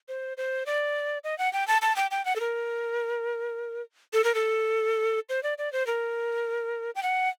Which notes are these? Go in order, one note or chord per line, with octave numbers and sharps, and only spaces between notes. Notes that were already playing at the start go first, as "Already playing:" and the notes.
C5
C5
D5
D#5
F#5
G5
A5
A5
G5
G5
F#5
A4
A#4
A4
A#4
A4
C5
D5
D5
C5
A#4
G5
F#5